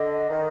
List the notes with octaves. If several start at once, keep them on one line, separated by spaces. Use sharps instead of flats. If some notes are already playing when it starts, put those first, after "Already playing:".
Already playing: D3 D#5
D#3